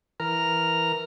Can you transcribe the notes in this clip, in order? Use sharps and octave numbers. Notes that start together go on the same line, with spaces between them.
E3 A#4 A#5 F6